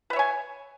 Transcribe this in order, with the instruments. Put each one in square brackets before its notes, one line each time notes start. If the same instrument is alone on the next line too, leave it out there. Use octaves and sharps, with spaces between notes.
[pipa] B4
E5
C#5
G#5